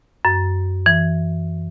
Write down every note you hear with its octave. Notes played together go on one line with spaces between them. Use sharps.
F#2
E3